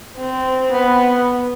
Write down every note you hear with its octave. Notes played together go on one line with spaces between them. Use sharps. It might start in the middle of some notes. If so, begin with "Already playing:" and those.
C4
B3